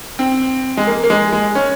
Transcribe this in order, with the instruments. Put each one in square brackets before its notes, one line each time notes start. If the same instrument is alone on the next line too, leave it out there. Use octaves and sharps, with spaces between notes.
[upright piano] C4
G#3
A#3
A#3
G#3
G#3
C#4